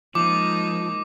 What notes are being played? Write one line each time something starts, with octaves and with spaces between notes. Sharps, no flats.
F3 G#3 A#3 D#4 D6